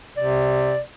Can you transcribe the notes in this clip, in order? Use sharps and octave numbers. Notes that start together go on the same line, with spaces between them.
C3 D5